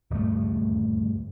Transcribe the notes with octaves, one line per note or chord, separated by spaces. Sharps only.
D#1 D2 G2 A3